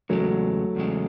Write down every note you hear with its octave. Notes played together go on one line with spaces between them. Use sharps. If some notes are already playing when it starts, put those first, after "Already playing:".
E2 C#3 F#3 G#3 A3
E2 C#3 G#3